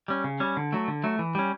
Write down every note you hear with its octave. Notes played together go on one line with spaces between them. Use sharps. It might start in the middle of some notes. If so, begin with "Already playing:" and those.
G3 C#4
C#3
G3 C#4
D3
F#3 A3
D3
F#3 A3
E3
G3 C#4